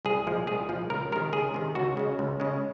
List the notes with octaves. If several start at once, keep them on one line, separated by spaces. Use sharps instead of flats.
C2 G#4
A#2 F3 G#3
C2 G#4
A#2 F3 G#3
C#2 A#4
C3 D#3 A#4
C#2 G#4
C3 D#3
C#2 F#4
C#3 G#3
C#2
C#3 G#3